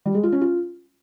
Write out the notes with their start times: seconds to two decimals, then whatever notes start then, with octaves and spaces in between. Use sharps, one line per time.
0.05 G3
0.14 G#3
0.23 F4
0.32 C#4
0.41 F4